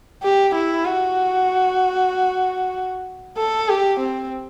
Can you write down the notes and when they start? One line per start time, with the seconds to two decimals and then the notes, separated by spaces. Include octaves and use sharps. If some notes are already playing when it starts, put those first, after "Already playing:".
0.23 G4
0.55 E4
0.85 F#4
3.37 A4
3.69 G4
4.00 C4